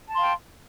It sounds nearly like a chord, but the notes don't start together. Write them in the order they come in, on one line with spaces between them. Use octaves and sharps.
A5 C6 F5 G5